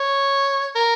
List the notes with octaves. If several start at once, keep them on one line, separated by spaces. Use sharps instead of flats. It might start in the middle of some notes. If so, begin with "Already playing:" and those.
Already playing: C#5
A#4